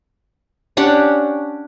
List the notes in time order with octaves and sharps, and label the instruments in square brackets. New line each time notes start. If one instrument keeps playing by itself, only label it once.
[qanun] C#4 D4 G4 F#5